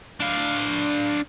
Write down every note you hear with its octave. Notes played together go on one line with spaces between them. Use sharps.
D4 F5